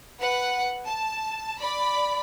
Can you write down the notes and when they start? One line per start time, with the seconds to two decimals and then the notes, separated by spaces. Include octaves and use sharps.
0.20 B4 F#5
0.85 A5
1.61 D5 B5